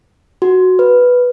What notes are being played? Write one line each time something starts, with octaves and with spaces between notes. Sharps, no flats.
F#4
B4